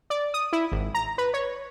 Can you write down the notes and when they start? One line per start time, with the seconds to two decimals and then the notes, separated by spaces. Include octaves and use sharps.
0.10 D5
0.34 D#6
0.53 E4
0.72 G#1
0.94 A#5
1.18 B4
1.34 C#5